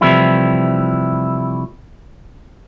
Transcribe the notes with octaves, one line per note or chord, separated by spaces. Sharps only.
C3 E3 F3 G3 A3 E4